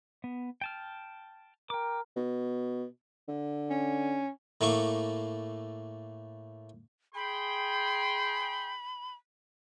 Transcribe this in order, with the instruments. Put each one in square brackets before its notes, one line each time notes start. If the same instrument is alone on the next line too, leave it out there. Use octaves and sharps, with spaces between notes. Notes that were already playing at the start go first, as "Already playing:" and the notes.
[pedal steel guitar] B3
G5 A5 F6
[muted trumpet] A#4 [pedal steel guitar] G5 D6
[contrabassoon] B2
D3
[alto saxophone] C#4
[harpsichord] A2 A3 A#3 C#6 D6
[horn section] G#4 G5 C6 [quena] B5